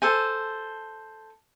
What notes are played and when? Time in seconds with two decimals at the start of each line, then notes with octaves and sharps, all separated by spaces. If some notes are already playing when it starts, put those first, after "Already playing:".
0.02 A4 C5 G#5